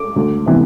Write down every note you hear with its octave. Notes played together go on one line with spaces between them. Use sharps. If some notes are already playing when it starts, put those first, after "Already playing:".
Already playing: D6
D2
C3 E3 B3